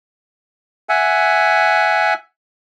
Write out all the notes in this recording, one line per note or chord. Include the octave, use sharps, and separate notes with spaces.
E5 F#5 G#5